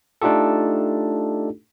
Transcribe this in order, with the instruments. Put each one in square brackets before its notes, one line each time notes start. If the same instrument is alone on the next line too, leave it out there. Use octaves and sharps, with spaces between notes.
[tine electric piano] A3 D4 D#4 F4 G4 A4